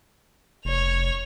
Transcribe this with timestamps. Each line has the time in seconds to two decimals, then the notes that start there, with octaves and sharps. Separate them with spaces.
0.65 F1 C#5 F7